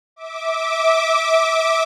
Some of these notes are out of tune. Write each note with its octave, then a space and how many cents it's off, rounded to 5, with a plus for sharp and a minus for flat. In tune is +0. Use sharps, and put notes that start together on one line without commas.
E5 -25 D6 +0